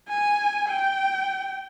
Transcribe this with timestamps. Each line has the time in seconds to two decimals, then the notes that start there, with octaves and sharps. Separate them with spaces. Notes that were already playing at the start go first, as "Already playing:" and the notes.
0.09 G#5
0.69 G5